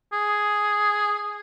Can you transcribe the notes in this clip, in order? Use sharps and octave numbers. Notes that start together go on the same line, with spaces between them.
G#4